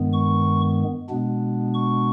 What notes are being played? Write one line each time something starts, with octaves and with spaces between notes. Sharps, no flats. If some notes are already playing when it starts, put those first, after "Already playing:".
Already playing: G2 D#3 G#3 B3
C#6
B2 G#3 B3 D4
C#6